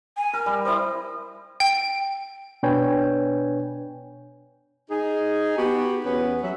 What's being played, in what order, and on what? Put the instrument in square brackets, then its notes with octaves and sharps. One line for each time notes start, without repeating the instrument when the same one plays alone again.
[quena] G#5
[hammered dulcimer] A#4 [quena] F6
[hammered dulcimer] G3
[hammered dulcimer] E4 C5 [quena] D#6
[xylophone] G5
[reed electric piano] B2 D4 B4 C#5 G5 G#5
[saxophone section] D#4 G#4
B3 F#4 G4
E2 B3 C#4
F#3 E5